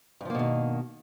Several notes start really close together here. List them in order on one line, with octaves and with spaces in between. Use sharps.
G2 F3 A#3 B2 D#3